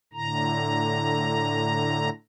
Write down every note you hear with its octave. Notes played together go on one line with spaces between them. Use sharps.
A2 D3 A#5